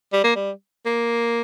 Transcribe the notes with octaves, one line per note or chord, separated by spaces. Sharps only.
G3
A#3
G3
A#3